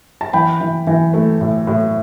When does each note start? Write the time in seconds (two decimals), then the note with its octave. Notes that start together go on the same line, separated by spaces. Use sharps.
0.21 A5
0.33 E3 G5 B5
0.61 E3
0.87 E3
1.14 A3
1.41 A2
1.67 A2